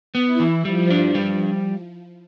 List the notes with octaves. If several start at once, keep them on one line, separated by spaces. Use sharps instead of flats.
B3
E4
E3
F3 G3
D4
G3